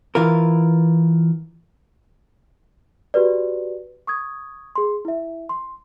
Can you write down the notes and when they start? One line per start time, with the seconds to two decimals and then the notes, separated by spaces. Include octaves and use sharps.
0.15 E3 F4 A#4
3.14 F#4 G4 B4 D5
4.07 C#6 D#6 G#6
4.76 G#4 C6
5.05 E4 E5
5.49 C6